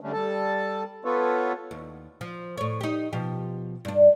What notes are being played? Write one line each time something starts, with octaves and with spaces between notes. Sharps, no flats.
D3 G3 A3 C#4 D4
G3 A4 A5
B3 F4 A4 B4 C#5
D#2
F3
A2 C#5
D#4 G4
B2 F3 G4
G2 D4